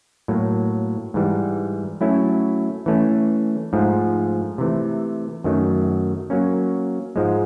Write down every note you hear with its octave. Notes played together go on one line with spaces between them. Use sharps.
A2 F#3 A#3
G#2 E3 G3
F#3 A3 C#4 E4
E3 A3 C#4
G#2 F3 A3
C3 E3 A3
F#2 D#3 F#3 A3
F#3 A#3 C#4
G#2 F3 G#3